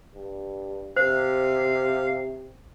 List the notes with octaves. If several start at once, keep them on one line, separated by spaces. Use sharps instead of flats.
G2
C3 C5 F5